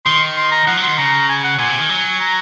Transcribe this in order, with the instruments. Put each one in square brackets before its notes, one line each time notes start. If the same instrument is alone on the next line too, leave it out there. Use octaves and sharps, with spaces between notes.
[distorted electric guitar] D#3 [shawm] C6
[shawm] C6
A#5
[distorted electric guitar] F3 [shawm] F#5
[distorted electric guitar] F#3
[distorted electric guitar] D#3 [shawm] C6
[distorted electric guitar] C#3 [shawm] A#5
[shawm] G#5
F#5
[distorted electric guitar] A#2 [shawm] G#5
[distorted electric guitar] C3
D#3
F#3
[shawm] A#5